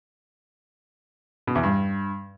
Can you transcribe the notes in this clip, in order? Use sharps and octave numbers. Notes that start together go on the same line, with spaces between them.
B2
E2
G2